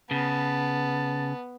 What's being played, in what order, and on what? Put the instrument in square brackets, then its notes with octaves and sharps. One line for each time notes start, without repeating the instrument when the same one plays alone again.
[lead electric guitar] C#3 [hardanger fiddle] B3 [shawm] A5